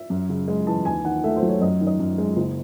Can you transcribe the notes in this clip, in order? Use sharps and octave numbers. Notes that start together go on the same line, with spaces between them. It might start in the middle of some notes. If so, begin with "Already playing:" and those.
Already playing: E5
F#2
C#3
G#3
E3 A5
D#2 G#5
D#3 F#5
A3 E5
C5
F#3
C#5
F#2 D#5
D#3
D#5
F#2
G#3
F#1